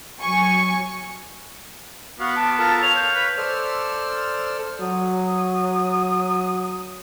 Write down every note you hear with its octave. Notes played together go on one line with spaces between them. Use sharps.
F#3 G#5 C#6
B3 F#4 F5
A5 D6
F4 A4 A#4 A5
C#5 F5 F7
G6
B4
A4 C5 D5 E6 F6
F#3 D#6